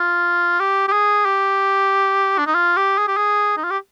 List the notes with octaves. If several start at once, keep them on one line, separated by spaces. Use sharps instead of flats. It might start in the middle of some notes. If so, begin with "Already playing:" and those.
Already playing: F4
G4
G4
G#4
G4
D4
D#4
F4
G4
G#4
G4
G#4
D#4
F4
G4